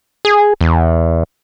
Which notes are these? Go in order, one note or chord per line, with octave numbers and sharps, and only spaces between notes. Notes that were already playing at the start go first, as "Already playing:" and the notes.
G#4
E2